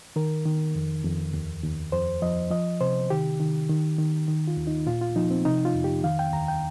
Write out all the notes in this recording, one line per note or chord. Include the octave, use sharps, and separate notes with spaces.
D#3 A#4
D#3
F2
F2
D#2
D#2
F2 C5
F3 D#5
F3 D#5
C3 C5
D#3 G4
D#3
D#3
D#3
D#3
F4
D#2
D#4
A#2 F4
F4
F3 D#4
C4
C3 D#4
F4
F2
G4
D#3 F5
G5
D#2 A#5
G5